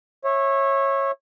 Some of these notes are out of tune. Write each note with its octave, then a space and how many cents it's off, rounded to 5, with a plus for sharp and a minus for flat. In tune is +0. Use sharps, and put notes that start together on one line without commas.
C#5 -20 E5 +0